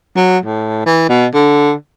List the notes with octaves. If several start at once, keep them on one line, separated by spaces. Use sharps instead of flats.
F#3
A2
E3
B2
D3